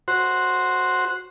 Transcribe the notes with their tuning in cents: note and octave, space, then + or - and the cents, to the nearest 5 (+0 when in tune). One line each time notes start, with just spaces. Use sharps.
F#4 -10 C5 +0